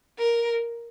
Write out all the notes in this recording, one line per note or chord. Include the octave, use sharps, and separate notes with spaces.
A#4